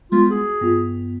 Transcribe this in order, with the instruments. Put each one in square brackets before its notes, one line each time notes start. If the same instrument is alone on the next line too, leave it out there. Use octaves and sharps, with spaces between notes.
[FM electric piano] G3 G#3 B3 [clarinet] F4
[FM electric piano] F#4 [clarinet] G#4
[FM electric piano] G2 B3 F4